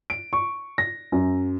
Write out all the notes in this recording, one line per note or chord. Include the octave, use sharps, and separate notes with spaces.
D7
C#6
A#6
F#2